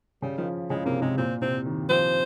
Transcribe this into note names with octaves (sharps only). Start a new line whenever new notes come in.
C#3 G3
D#3 F3
C#3 G#3
C3 A#3
C3 G#3
A#2 C4
C3 C4
D#3
F3 C5